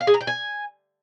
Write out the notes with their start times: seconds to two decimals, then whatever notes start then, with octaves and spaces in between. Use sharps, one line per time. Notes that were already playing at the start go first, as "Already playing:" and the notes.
0.01 F5
0.07 G#4
0.14 A#5
0.21 G5
0.27 G#5